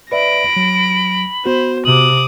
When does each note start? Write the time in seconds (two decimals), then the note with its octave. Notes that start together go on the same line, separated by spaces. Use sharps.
0.12 B4 D5 E5 B5 A#6 D7
0.56 F#3
1.46 B3 F#4 C5
1.85 C3 D6 D#6 F#7